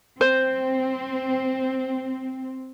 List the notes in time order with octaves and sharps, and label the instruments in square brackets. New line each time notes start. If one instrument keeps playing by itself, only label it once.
[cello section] C4 [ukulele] C5